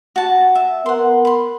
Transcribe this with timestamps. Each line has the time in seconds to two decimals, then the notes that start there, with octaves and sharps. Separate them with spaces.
0.16 F#4 A5
0.55 E5
0.86 B3 A#4 F#5 C6
1.25 B5 C6